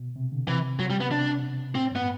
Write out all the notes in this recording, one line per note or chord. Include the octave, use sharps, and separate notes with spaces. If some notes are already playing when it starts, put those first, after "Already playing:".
Already playing: B2
C3
D3
C3 E3
F#3
G3
B3
C3 D4
C3
A2 C4
G2 B3